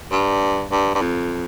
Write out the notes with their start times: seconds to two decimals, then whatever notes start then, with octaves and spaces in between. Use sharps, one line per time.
0.11 G2
0.71 G2
0.95 G2
1.01 F2